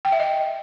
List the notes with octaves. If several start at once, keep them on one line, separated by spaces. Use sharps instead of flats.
G5
E5
D#5